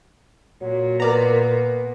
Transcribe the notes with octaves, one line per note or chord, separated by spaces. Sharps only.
A#2 F#3
B3 A#4 D5 A#5